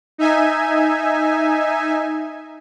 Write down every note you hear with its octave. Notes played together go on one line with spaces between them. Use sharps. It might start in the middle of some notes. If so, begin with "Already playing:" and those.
D#4 E5 G#5